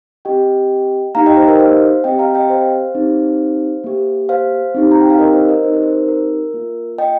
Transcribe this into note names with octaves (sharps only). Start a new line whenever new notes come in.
C4 G4 D#5 G5
A#3 D#4 G4 F5 A#5
D#5 G5
C5
A#4 D#5
C5 F5
C4 G4 D#5 G5
F5 A#5
D#5 G5
C5 F5
C4 D#4 G4
A#3 G4
C5 F5
C4 D#4 G4
A#5
G5
F5
A#4 D#5
C5
A#4 D#5
C4 D#4 G4 C5
A#4
C5
A#4
A#3 F4
D#5 G5